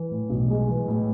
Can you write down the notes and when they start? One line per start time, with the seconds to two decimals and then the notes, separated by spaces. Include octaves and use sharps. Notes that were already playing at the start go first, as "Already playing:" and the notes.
Already playing: E3
0.11 A2
0.30 B1
0.50 G#3
0.69 E3
0.88 A2